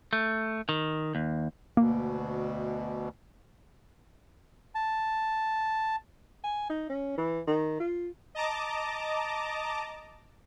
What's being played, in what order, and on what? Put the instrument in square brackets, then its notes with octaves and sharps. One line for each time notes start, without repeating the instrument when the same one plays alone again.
[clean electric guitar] A3
D#3
D#2
[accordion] D2 B2 [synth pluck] A#3
[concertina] A5
[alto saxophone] G#5
D#4
C#4
E3
D#3
F4
[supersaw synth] D#5 A5 A#5 D6